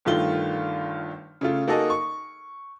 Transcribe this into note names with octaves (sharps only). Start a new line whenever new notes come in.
G1 G2 D#3 A3 F4 G7
C#3 A3 F4
A#3 D#4 F#4 G#4 A4 D#5
C#6